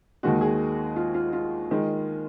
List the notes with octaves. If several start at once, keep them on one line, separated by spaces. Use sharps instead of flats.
D#2 D#3 G#3 F#4
G#4
F4
F4
F4
D#3 G#3